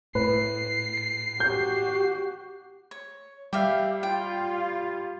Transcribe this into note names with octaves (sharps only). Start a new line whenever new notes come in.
A2 B4 C7
F#4 G4 G6
C#5
G3 G4 E5 F5
F4 G5